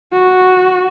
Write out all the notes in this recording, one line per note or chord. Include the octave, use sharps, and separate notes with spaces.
F#4